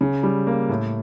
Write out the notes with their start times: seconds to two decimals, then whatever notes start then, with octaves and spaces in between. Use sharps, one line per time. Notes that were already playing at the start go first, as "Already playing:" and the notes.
0.01 C#3
0.23 G3
0.47 A#3
0.69 A2